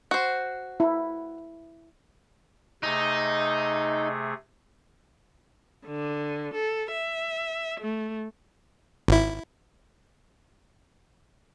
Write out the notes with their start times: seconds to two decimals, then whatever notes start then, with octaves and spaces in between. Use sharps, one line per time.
0.11 F#4 C5
0.80 E4
2.83 C3 A3 D#4 G#4
5.86 D3
6.53 A4
6.93 E5
7.81 A3
9.08 G#1 E4